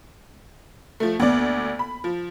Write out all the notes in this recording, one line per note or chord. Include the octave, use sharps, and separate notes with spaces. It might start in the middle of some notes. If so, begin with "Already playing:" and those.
F3 A3
D2 A#3 B3 D5
B5
F3